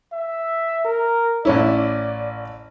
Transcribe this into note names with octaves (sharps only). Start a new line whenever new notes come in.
E5
A#4
A1 C#4 E4 D5